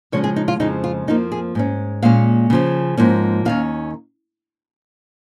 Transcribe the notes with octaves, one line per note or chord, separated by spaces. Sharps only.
C#3 F3 G#3 C#4 C#5
G#4
D#4
F4
F2 C#3 F3 G#3 D#4
F4
F2 F3 A#3 D#4
G#4
G#2 G#3 C#4
A#2 G#3 C#4 F5
C#3 F3 C#4
G#2 F3 A#3 C#4
D#2 D#3 C#4 F5